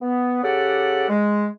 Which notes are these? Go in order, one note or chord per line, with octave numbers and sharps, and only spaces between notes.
B3
C#3 G4 A4 D5 F#5
G#3